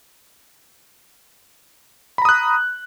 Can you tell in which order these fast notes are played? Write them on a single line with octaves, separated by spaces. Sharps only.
B5 A#5 D#6 F#6